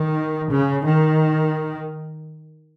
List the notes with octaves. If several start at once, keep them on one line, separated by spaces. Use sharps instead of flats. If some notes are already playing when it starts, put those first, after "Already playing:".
Already playing: D#3
C#3
D#3